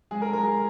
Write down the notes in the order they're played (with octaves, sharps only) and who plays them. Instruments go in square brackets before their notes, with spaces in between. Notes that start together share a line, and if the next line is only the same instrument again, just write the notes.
[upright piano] G#3 G#4
A#4
G#3 A#4
G#4